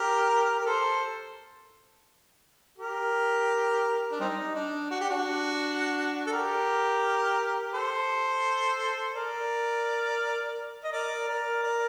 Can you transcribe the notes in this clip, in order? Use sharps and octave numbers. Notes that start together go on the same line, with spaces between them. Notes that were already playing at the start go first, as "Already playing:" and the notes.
Already playing: G4 A#4
A#4
A4 C5
G4 A#4
D4
G3 C4 D#4
D4
F#4
G4
D4 F#4
A4
G4 A#4
A4 C5
A#4 D5
D#5
A#4 D5
A#4 D5
A#4 D5